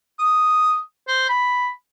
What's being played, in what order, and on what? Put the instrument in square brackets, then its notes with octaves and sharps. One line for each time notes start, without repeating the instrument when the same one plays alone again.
[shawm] D#6
C5
B5